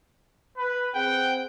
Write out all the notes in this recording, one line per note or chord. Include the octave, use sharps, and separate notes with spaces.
B4
C4 G#4 F#5 G5